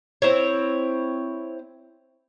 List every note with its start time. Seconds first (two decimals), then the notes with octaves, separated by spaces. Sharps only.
0.22 C4 E4 C#5